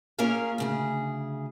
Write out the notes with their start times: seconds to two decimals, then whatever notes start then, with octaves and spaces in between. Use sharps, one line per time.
0.18 A#3 C#4 F4 G#4 A#4 F5
0.58 D2 C#3 G#4